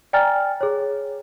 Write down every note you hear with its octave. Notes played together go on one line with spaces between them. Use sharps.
D5 G5 G#5 A#5 F6 A6
G#4 C#5